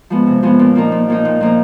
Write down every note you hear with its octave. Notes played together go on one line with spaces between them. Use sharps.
F3 G#3 B3
C3
F3 G#3 B3
A#2
F3 A#3 D#4
A#2
F3 A#3 D#4
A#2
F3 A#3 D#4